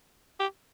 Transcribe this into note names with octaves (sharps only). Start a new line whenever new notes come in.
G4